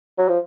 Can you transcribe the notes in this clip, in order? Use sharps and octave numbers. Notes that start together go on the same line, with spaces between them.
F#3
F3